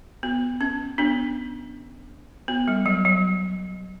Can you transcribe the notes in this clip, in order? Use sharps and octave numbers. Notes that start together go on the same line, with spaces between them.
B3
C#4
B3 D4
B3
G3
F#3
F#3